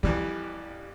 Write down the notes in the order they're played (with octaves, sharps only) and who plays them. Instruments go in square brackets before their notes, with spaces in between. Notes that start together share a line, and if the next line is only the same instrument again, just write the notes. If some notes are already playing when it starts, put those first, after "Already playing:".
[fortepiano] F2 E3 G3 [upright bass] E4